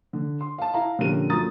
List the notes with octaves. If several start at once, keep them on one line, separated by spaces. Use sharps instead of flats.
D3
C6
F5 A5
E4 F5 A#5
A#1 D3 G3 C#4 A#4 D#7
F#2 F3 A3 A#5 D#6 A6